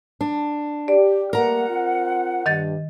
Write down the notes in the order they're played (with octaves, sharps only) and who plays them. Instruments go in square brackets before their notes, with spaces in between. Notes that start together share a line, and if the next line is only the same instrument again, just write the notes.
[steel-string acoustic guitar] D4
[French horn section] G4 [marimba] D5
[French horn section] G3 A3 A#3 [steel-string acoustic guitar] A#4 A#5 [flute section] F#5
[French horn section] C4 F4
[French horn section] G2 [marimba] D#3 D#5 A6